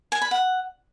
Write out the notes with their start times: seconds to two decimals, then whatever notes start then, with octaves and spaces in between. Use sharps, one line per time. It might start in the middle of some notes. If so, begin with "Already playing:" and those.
0.12 G#5
0.21 B5
0.31 F#5